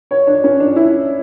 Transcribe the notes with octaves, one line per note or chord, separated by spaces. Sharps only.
C#5
D4
C#4
D4
E4